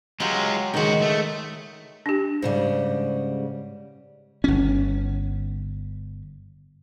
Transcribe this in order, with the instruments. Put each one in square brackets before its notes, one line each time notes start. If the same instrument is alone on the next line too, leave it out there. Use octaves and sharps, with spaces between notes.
[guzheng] F#3 G4 [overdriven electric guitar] G#3 F4
[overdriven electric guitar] C#2 F#4 [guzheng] D#3 G#3
[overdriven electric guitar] A3
[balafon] D4 G4
[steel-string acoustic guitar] G#2 C#3 G3
[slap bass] G1 C#4